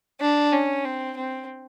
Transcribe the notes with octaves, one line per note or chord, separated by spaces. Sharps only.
D4
C#4
C4
C4